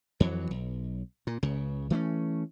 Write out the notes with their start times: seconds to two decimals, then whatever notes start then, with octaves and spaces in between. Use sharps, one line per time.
0.20 F2 E3 F#3
0.51 B1
1.27 A#2
1.43 C#2 C#3
1.90 E3 A3 A#3 C#4